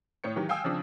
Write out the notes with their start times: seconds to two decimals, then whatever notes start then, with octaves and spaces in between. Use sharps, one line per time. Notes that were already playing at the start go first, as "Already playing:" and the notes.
0.24 A2 C#5 C#7
0.36 D#3 E3 F#3 G4
0.49 F5 G5 G#5 D#6 E6
0.64 C#3 F3 C4 D4